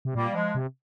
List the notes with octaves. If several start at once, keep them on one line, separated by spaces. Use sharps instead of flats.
C3
A#2 G3 A#3
F3 G#3
C3